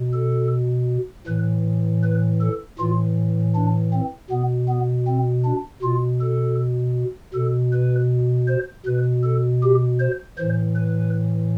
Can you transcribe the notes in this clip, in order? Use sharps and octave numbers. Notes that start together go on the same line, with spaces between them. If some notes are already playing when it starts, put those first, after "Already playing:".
Already playing: B2
A4
A2 E3 B4
B4
A4
A2 E3 F4
D4
C4
B2 B3
B3
C4
D4
B2 F4
A4
B2 A4
B4
C5
B2 B4
A4
G4
C5
A2 E3 C5
B4